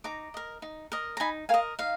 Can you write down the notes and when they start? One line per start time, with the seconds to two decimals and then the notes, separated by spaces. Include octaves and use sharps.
0.04 D#4 A#5 D6
0.34 A#4 D#5
0.62 D#4
0.92 A#4 D#5
1.17 A#5
1.20 D#4 G#5 B5
1.49 A#4 D#5 F5 G#5
1.79 D#4 F5